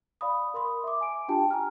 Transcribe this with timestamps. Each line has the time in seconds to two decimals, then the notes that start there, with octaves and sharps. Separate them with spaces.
0.21 D5 F5 B5 D#6
0.54 A#4 B5 C6 D#6
0.84 E5 D6
1.01 G#5 D7
1.28 D4 F4 G4 G5 A5
1.51 G#5 A#5 F6